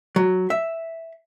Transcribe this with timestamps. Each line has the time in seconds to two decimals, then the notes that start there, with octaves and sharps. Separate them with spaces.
0.16 F#3
0.50 E5